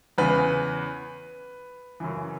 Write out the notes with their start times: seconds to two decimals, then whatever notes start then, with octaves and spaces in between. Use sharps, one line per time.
0.18 E2 C#3 E3 B4
2.00 F#2 C#3 E3